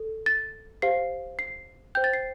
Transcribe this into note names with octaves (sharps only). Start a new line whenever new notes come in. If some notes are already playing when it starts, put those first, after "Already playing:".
Already playing: A4
A6
G4 C5 F5 C7
C7
C5 G5 G6
A6
C7